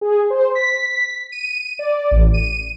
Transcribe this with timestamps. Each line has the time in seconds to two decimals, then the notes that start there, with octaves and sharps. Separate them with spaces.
0.01 G#4
0.30 C5
0.55 B6
1.32 D#7
1.79 D5
2.11 A1
2.34 D#7